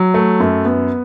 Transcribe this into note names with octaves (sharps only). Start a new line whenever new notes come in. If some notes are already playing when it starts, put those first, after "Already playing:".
Already playing: F#3
A3
F#2
B3